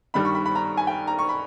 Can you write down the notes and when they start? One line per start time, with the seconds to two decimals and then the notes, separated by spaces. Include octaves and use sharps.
0.14 G2 D#3 G3 B5
0.25 C#6
0.35 B5
0.46 B5
0.55 A#5
0.77 G#5
0.87 G5
1.07 A#5
1.19 C#6
1.29 B5